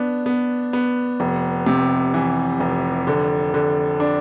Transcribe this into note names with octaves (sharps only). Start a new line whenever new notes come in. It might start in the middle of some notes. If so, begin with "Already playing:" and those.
Already playing: B3 D4
B3
B3
F1
C3
E3
F1
D3
D3
D4